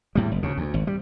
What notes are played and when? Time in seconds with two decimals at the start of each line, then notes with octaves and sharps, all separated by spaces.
0.15 E2 A2 G3
0.31 F#1
0.43 D2 C#3
0.57 D2
0.74 G#1
0.87 G3